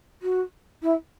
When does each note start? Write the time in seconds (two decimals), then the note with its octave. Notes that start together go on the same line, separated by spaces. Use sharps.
0.22 F#4
0.82 E4